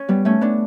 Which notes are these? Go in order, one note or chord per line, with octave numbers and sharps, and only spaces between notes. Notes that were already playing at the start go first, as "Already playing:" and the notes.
Already playing: C#4
G3 B3
A3 C#4
B3 D4